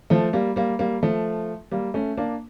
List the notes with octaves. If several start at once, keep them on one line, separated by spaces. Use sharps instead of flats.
F3 A3
G3 A#3
G3 A#3
G3 A#3
F3 A3
G3 A#3
A3 C#4
A#3 D4